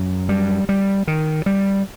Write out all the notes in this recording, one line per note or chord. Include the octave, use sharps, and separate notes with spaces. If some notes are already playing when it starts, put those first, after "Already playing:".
Already playing: F#2
G3
G3
D#3
G3